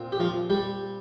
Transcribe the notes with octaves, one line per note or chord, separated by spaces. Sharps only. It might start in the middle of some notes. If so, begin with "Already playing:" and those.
Already playing: A#2 C4
G4
F3 F4
G3 G4